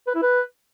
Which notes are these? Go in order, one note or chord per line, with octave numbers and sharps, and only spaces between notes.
B4
E4
B4